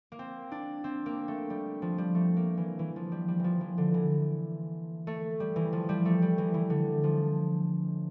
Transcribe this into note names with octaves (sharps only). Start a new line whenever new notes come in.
A#3
C4
D4
C4
A#3
A3
G3
F3
G3
A3
A#3
E3
E3
F3
G3
G3
E3 F3
E3
D3
E3
A3
G3
E3
F3
G3
A3
G3
E3
E3
D3
F3